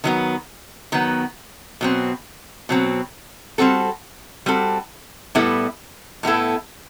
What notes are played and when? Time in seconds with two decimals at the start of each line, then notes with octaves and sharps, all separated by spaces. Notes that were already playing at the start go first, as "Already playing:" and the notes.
0.04 D#3 F#3 B3
0.92 D#3 F#3 B3
1.81 B2 F#3 C4
2.69 B2 F#3 C4
3.58 G3 C4 F#4 A4
4.46 G3 C4 F#4 A4
5.35 A2 G3 B3 E4 A4
6.23 A2 G3 B3 E4 A4